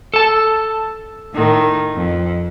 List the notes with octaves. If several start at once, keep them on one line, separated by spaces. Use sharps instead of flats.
A4 A5
A2 D#3
F2